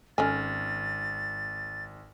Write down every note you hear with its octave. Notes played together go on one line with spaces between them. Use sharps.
G#1 C#4 A4 G#5 F6 A6